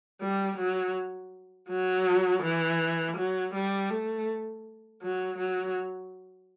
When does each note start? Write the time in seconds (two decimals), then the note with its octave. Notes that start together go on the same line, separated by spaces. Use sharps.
0.21 G3
0.57 F#3
1.69 F#3
2.42 E3
3.17 F#3
3.54 G3
3.90 A3
5.02 F#3
5.38 F#3